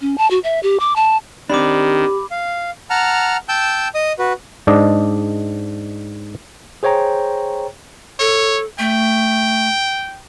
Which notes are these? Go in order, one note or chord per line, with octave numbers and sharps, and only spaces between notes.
C#4
A5
F#4
E5
G4
D6
A5
D#3 C4 D4 G4 B5 D6
F5
F#5 A5 A#5 F6
G5 A5 E6 G6
D#5 D#6
F#4 B4
G#2 D4 D5 D#5
G#4 C5 C#5 G5 A#5
A4 C#5
A3 G5